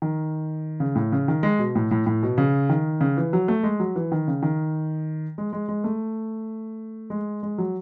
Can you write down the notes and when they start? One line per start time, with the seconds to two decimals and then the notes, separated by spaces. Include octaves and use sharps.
0.02 D#3
0.80 C#3
0.95 A2
1.12 C#3
1.28 D#3
1.43 G#3
1.59 B2
1.75 A2
1.91 A2
2.07 A2
2.23 B2
2.38 C#3
2.69 D#3
3.01 C#3
3.17 E3
3.33 F#3
3.48 A3
3.63 G#3
3.80 F#3
3.96 E3
4.12 D#3
4.28 C#3
4.42 D#3
5.38 G#3
5.53 G#3
5.69 G#3
5.84 A3
7.10 G#3
7.43 G#3
7.58 F#3